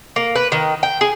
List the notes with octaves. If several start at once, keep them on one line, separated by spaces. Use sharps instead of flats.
A#3
B4
D#3
G5
G#4